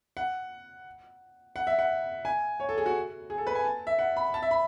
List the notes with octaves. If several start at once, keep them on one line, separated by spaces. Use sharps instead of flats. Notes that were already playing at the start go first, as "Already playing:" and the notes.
F#5
F#5
E5
F#5
G#5
C#5
A4
G#4
F#4
G#4
A4
B4
G#5
A5
E5
F#5
B5
A5
E5
B5